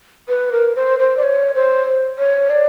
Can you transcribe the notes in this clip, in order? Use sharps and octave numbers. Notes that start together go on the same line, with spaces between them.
B4
A#4
C5
C5
D5
C#5
C5
C#5
D5